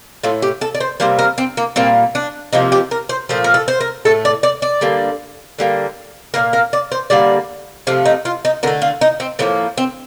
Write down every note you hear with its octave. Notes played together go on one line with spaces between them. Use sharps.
A2 A3 F4
G4
A4
D5
C5
C3 G3 A#3 C5
A#4
C4
A#3
A#2 G3 A#3 C4
D4
C3 F3 A#3 D#4
G4
A#4
C5
A#2 F3 A3 C5
A#4
A4
C5
A#4
A2 A3 A4
D5
D5
D5
D3 G3 A#3
D3 G3 A#3
A#2 G3 A#3 A#4
A#4
D5
C5
D3 G3 A#3 D5
C3 F3 A3 F4
D#4
F4
D#4
D3 A3 A#4
F4
D#4
C4
A2 F3 A#3 C4
C4